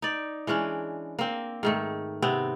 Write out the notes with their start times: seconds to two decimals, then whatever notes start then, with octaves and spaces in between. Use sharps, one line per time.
0.02 D#4 D5
0.47 E3 G#3 C#4 D4
1.19 A#3 C4
1.63 G#2 D#3 A3
2.22 C3 B3 C4